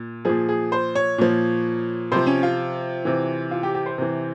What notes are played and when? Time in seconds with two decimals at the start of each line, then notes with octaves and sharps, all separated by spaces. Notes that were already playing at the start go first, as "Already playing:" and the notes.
Already playing: A#2
0.25 A#2 F3 G#4
0.49 G#4
0.72 C5
0.95 C#5
1.18 A#2 F3
2.12 C3 F3 C5
2.27 C#4
2.43 F4
3.05 C3 E3
3.51 F4
3.63 G4
3.75 G4
3.86 C5
3.98 C3 E3